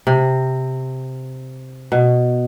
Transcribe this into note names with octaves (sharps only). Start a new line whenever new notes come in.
C3
B2